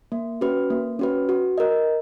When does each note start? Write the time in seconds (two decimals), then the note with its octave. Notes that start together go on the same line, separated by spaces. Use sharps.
0.12 A#3
0.41 C#4 F#4 B4
0.70 A#3
0.99 C#4 F#4 B4
1.29 F#4
1.58 A#4 D#5